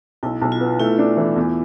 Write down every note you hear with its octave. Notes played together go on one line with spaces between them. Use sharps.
B1 E4
B1
F4
B3
A3 E4
D4
E3
E2